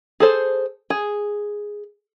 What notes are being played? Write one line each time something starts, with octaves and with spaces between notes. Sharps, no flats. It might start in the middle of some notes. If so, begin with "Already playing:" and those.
G#4 A4 C5
G#4